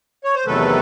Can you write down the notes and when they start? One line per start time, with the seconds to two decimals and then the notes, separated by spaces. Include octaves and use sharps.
0.24 C#5
0.35 C5
0.46 E2 C3 D#3 F#3 A3 A4 B4